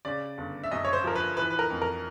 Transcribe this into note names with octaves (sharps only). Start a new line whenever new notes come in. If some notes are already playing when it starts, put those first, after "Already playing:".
C#3 D5
G1
E5
F#2 D#5
C#5
C5
F3 A#4
B4
E3 B4
B4
A#4
F2
A#4